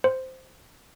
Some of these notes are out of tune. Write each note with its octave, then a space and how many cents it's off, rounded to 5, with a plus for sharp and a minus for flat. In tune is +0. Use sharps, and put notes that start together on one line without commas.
C5 -5